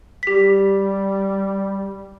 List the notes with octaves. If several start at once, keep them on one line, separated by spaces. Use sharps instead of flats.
G3 G4 B6